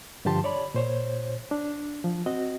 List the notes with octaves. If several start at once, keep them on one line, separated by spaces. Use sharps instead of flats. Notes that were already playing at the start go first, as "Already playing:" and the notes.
G2 D3 F3 G4 A5 C6
C#5 D5 B5
A#2 C5 C#5
D4
F3
C4 F#4 D#5